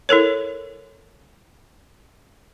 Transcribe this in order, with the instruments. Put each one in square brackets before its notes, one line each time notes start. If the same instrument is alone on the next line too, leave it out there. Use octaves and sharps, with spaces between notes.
[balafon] E4 A4 A#4 C#5